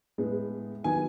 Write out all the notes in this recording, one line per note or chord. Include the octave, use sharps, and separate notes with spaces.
A2 G#3 B3
D#3 F#3 B3 G#5